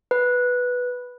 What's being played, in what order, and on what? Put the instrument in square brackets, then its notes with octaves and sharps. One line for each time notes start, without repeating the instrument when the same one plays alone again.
[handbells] B4